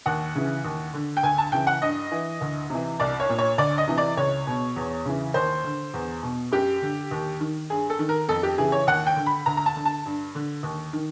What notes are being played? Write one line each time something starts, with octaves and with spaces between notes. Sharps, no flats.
D#2 F#5
C#3 E3
D#2
D3
G5
D2 G#5
A5
C#3 E3 G5
F#5
G2 D#5
E3
D2
C3 E3
C2 D5
C#5
A#2
C#5
D2 D5
D#5
C3 E3
D5
C#2 C#5
B2
E2
C#3 E3
D#2 C5
D3
E2
B2
F#2 G4
D3
D#2
D#3
G2 G#4
A4
D#3
A#4
F2 A4
G4
C#3 E3 G#4
C#5
D#2 F#5
G5
D3
B5
D2 A#5
A#5
A5
D3
A5
G2
D3
D#2
D#3